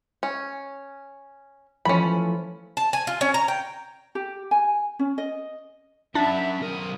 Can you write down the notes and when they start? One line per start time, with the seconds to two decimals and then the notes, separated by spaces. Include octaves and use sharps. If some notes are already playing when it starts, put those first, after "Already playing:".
0.23 C#4
1.85 E3 F3 A3 C#4 B5
2.77 A5
2.93 G#5
3.07 F4
3.21 C#4
3.34 A#5
3.48 G5
4.15 G4
4.51 G#5
4.99 C#4
5.18 D#5
6.15 C#4 D4 E5 F#5 B5
6.63 B1 A#4 D#6